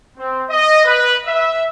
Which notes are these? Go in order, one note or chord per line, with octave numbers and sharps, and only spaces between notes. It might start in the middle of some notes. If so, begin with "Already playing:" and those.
C4
D#5
B4
E5